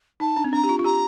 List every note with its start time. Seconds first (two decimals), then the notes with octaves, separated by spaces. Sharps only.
0.20 D#4 A5
0.36 D4
0.44 C4
0.53 D4 A#5
0.63 G4
0.69 F4
0.79 F4
0.84 G4 A#5